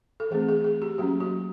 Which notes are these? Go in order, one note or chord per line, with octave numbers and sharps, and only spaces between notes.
A4
E3 A3 C4 G#4
G#4
G#4
G4
F#3 A#3 C#4 F#4
F#4